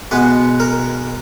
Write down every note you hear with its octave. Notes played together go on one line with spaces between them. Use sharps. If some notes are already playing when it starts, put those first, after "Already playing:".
B2 G#3 B3 B4
A#4